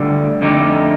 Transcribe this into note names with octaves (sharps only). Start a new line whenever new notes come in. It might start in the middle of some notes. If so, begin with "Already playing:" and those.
Already playing: D2 D3 G3
F2 D3 A3 D#4 G4